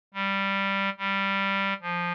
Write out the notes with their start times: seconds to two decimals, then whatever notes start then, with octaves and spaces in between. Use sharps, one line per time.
0.14 G3
0.98 G3
1.81 F3